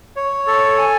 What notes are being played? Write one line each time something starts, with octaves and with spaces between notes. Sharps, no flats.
C#5
A4
G#5